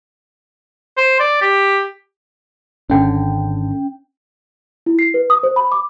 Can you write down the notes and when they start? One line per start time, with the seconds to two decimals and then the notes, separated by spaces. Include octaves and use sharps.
0.97 C5
1.20 D5
1.41 G4
2.90 G#1 D3 C#4 G5
4.86 E4
4.99 C7
5.14 B4
5.30 D#6
5.43 C5
5.56 B5
5.72 D6